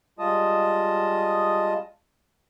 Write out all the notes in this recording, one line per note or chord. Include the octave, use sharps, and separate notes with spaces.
G3 G#3 F4 D#5 A5 D#6